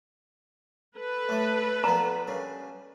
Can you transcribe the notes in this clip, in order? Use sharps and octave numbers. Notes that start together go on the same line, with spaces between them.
A4 B4
A2 A3
A#2 F3 B3 A#5
G2 C#3